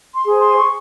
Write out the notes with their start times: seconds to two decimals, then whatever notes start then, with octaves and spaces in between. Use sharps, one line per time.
0.14 C6
0.27 G#4 C5
0.40 C6
0.57 C#6